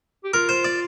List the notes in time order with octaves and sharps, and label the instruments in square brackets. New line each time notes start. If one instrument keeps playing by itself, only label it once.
[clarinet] G4
[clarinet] F4 [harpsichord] A#4
[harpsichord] C5
D5